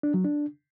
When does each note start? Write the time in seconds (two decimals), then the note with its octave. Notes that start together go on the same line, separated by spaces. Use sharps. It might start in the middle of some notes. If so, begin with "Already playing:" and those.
0.03 D4
0.14 F#3
0.25 D4